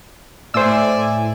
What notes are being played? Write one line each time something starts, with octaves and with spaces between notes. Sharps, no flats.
A2 C5 D5 E5 G#5 E6